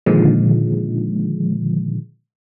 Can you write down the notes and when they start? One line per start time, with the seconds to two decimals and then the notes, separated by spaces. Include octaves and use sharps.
0.06 A#2 D3 D#3 F3 G#3